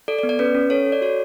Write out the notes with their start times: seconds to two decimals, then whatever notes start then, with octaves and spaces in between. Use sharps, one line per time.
0.08 A4 D5
0.19 D5
0.23 B3
0.29 D5
0.39 C#4 B4
0.55 C#4
0.70 A4 C#5
0.86 A4
0.92 D5
1.01 F#4 C#5